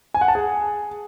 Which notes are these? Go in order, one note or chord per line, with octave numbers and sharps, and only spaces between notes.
G#5
F#5
A5
G#4